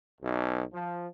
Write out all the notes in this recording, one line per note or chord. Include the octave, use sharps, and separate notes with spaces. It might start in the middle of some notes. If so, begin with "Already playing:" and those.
B1
F3